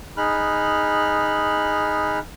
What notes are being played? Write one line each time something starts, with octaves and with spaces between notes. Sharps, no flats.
D#4 G#4 B5 F6 F#6